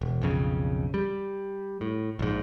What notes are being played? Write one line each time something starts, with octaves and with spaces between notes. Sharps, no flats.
E1
B1 F2 C#3
G3
A2
A#1 G#2